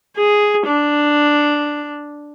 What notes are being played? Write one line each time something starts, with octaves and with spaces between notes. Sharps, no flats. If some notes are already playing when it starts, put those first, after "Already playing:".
G#4
D4